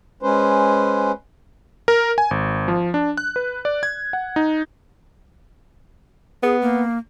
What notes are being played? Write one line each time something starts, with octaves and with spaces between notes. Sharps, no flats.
G#3 C#4 B4 C5
A#4
G#5
G#1
F3
D4
F#6
B4
D5
G#6
F#5
D#4
B3 G#4
A#3